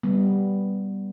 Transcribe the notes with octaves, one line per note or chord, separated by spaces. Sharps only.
G3 B3